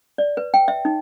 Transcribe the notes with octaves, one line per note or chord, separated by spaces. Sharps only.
D5
B4
G5
E5
D#4